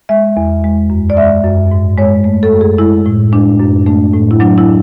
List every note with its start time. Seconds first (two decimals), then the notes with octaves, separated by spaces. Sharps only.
0.09 G#3 E5
0.37 E2
0.64 G#3
0.90 F#2
1.10 D5
1.17 G#3 E5
1.44 F#2
1.72 G#2
1.98 G#3 C#5
2.24 A3
2.43 A4
2.52 F#2
2.61 G#4
2.78 G#3 E4
3.06 A2
3.32 G#3 D4
3.59 F#2
3.86 A3 D4
4.14 A2
4.31 E4
4.40 F#3 D4
4.58 E4